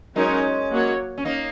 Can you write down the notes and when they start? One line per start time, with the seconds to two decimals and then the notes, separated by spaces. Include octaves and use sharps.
0.16 F#3 G#3 C#4 D#4 A#4 C#5
0.71 F#3 A#3 F#4 C#5
1.18 C#4
1.25 A#3 D#4